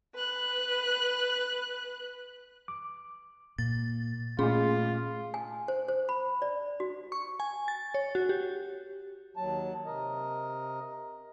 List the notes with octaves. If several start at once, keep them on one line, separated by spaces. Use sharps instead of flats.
B4 F#6
D6
A#2 A6
A#2 A3 C#4 F4 G#4 B5 C6
G#5
C5
C5
B5
D5
F#4
C#6
G#5
A6
C#5
F#4
G4
D#2 F#3 A5
C3 A#4 D#5